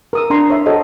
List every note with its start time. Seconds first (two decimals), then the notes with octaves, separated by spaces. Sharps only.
0.13 A#4 D#6 E6
0.30 D4 A#5 C6
0.50 C#5 E5
0.66 F#4 A4 C5 C#5 D#5